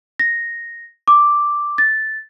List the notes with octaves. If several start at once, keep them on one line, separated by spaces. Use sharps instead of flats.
A#6
D6
A6